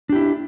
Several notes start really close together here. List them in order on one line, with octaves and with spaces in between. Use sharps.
D4 G4 E4